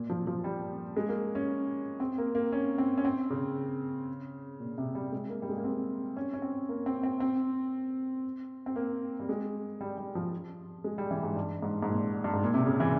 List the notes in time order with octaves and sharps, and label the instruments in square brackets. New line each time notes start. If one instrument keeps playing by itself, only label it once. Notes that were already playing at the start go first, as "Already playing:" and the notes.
Already playing: [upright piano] A#2
F3
F3
G3
G#3
A#3
C#4
C4
A#3
A#3
C#4
C4
C#4
C4
C#3
A#2
C3
G3
G#3
A#3
G3
G#3
A#3
C4
C#4
C#4
C4
A#3
C4
C4
C4
C4
A#3
G3
G#3
G3
G3
F3
G#3
G3
E3
G#2
G2
G#2
G#2
A#2
G2
G#2
A#2
C3
C#3
E3